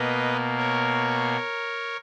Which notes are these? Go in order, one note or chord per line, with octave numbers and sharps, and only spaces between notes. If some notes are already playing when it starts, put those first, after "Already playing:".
Already playing: B2 A#3 B4 D#5
A#4 C#5